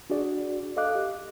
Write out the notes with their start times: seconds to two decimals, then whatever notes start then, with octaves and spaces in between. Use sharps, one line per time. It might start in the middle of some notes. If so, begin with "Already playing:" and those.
0.10 D4 F#4 G#4 D5
0.76 A4 D#5 F5 D6 F#6
0.95 G4